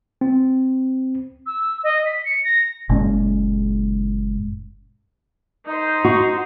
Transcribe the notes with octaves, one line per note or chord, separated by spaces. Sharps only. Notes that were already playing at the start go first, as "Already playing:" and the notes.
C4
E6
D#5
B6
C#7
A#6
F#1 A#2 G#3 C#4
D#4 C5
F#4